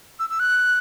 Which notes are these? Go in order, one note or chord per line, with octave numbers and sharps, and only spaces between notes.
E6
E6
F#6